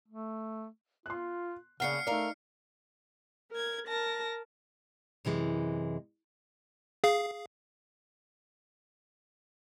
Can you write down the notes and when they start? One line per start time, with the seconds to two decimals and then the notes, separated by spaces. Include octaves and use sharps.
0.08 A3
1.06 F4 C6 F#6
1.80 C#3 A#3 C#4 D4 F#5 F6 C7 C#7
2.07 A3 D#4 A#4 D5 F5
3.51 A#4 G#6
3.87 A#4 A5 A#6
5.25 F#2 C3 E3 G#3
7.04 G#4 F5